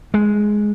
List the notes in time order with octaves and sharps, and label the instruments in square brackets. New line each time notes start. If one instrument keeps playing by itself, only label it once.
[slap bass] G#3